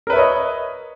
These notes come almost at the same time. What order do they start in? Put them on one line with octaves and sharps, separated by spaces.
A#4 B4 E5 C#5 D#5